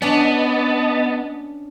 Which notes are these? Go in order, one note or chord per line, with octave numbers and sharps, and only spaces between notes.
B3 C#4 D4 D5 D#5 A5